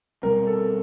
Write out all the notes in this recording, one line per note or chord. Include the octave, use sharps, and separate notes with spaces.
B2 G3 C4 A#4
A4